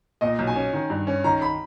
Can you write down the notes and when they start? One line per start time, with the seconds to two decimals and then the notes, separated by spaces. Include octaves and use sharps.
0.21 A#2 D#5
0.39 B1
0.47 G#5
0.56 C#4
0.74 D#3
0.90 G2
1.07 C#4
1.24 D#3 A#5
1.42 B5